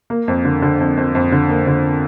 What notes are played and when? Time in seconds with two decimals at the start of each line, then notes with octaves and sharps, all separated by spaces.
0.10 A#3
0.28 F2
0.45 D3
0.62 D3
0.80 F2
0.97 F2
1.15 F2
1.32 D3
1.49 A#3
1.67 D3